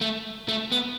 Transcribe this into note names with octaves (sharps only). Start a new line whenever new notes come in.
A3
A3
B3